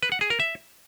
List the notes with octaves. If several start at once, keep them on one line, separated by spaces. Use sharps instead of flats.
B4
F#5
G#4
A#4
E5